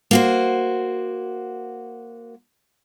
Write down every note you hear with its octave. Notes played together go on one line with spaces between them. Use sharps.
A#3 F#4 C5